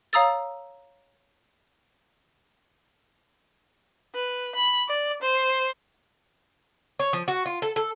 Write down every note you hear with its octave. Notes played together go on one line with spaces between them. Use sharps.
C#5 F5 A#5 D#6 E6 A6
B4
B5
D5
C5
C#5
F3
F#4
F4
A4
A4